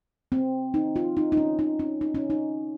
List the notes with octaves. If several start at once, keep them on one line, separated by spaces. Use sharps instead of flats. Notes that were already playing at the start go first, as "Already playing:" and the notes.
C4
D#4
F4
D#4
D#4
C#4
D#4
C#4
D#4
C#4
D#4